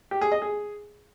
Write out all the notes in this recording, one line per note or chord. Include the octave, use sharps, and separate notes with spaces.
G4
G#4
D#5
G#4